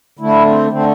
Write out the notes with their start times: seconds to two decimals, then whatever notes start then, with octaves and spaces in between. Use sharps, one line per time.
0.19 D3 A3 E4
0.45 C4
0.70 D3 A3 C4